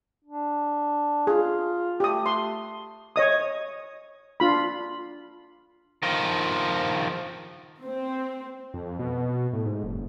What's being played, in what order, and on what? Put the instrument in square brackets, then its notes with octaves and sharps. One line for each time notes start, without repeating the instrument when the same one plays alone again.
[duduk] D4
[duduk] F4 [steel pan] G#4
[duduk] A3 [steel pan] G4 D#6
[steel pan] C6
C#5 D#5 D#6
D4 F4 B5
[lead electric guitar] D#3 F3
[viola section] C4
[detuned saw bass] F2
B2
A2
G#2
F#1